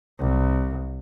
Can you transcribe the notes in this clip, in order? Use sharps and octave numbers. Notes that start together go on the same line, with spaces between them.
C2